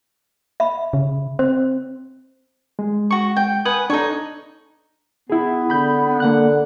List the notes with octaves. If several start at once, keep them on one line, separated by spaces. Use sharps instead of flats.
E5 B5
C#3
C4 C5
G#3
F#4 C#6
G5
B4 F#5 G#5 D#6
D4 D#4 A4 C#5
B3 E4 G#4
D3 B5 G6
D3 A#3 F#5 F#6